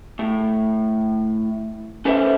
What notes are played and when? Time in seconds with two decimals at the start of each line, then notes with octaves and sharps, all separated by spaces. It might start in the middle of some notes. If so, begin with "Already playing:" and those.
0.19 A2
2.05 C#4 A4 B4 C5 D5 E5